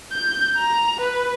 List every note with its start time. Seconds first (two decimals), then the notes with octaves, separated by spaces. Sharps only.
0.12 G6
0.57 A#5
1.01 B4